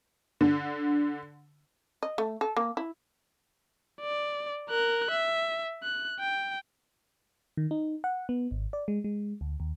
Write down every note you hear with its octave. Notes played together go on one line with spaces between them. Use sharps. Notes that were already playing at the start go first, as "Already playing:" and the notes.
D3
D#5
A3
A4
A#3
E4
D5
A#4 F#6
E5
F#6
G5
D#3
D#4
F#5
B3
G#1
D5
G#3
G#3
D2
D#2